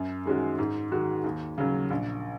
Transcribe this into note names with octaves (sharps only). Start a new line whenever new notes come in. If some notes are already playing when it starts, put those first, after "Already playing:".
Already playing: F#2
D#3 G#3 C#4 F#4
G#2
D#3 G#3 F#4
D#2
C#3 F#3
A#1